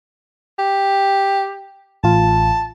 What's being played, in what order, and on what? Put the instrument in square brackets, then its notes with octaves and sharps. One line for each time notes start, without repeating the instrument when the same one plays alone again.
[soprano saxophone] G4
[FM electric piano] A1 F4 [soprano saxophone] A5